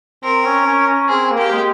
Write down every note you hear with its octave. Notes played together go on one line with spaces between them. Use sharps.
C4 A#4
C#4
C#4
C#4
C4 G#4
A#3
G4
G#3